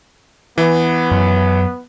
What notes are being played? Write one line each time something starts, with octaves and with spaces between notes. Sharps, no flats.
E3 B3
F#2